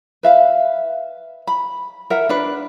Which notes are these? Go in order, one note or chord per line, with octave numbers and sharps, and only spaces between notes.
B4 E5 F5
B5
A#4 E5 F#5
D4 B4